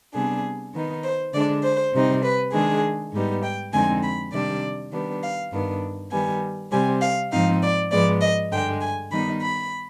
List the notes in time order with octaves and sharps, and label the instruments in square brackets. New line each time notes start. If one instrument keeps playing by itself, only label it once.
[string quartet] C3 G3 B3 D4 G#4
D#3 B3 D#4
C5
D3 G#3 D4 D5
C5
C3 G3 C4 D#4
B4
D#3 G#3 D4 G#4
G#2 G3 B3 D#4
G5
F2 D3 G#3 C4 D#4 G#5
B5
C3 D#3 G3 D4 D5
D#3 G3 B3 D4
F5
G2 D#3 B3 D4
D#3 G3 B3 G#5
C3 G3 C4 G#5
F5
G#2 F3 C4 D#4 F5
D5
G#2 F3 G#3 B3 D5
D#5
G2 D3 G#3 G5
G#5
D#3 G3 B3 D#4 B5
B5